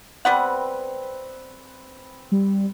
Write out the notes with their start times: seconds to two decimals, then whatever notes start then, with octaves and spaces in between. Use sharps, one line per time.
0.25 G3 B3 C4 B4 F#5
2.32 G3